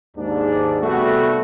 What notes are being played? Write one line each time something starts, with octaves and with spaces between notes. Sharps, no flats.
D#2 G#2 D4
C3 G3 A3 B3 F#4